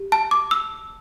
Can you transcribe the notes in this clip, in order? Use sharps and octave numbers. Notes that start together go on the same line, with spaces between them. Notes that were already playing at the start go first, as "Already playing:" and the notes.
Already playing: G4
A5
D6
E6